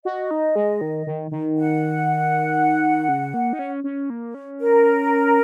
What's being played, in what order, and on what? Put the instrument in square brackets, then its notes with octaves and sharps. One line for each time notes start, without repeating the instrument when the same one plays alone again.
[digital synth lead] F#4 [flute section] D#5
[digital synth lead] D#4
G#3
D#3
D#3
D#3
[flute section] F#5
[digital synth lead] C#3
A#3
D#4
C#4
C#4
A#3
C#4
[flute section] A#4